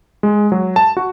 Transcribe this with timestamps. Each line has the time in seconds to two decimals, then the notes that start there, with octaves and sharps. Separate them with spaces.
0.23 G#3
0.52 F#3
0.76 A5
0.97 F#4